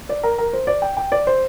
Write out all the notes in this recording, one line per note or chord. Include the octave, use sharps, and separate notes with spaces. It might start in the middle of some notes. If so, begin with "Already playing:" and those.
D5
A#4
A#4
C5
D5
G5
G5
D5
C5